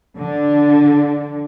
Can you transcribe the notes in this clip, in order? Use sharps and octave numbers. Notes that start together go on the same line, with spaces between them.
D3